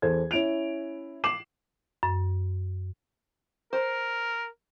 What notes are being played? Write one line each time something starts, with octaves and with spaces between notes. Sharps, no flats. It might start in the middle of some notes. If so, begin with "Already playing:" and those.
E2 A4 C5 G#6
C#4 E4 D7 F7
D6 C7 E7 F#7
F#2
A#4 C5